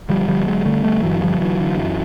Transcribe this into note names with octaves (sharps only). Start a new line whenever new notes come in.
D3 F3 G3
D3 F3 G3
D3 F#3 G#3
D3 G3 A3
D3 G3 A3
G2 E3 F#3
D3 F3 G3
D3 E3 F#3
D3
F#2